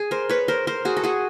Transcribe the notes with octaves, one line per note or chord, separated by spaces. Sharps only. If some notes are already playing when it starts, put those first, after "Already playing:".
Already playing: G#4
A#4 C5
B4 C#5
A#4 C5
A#4 C5
F#4 G#4
A4
F#4 G#4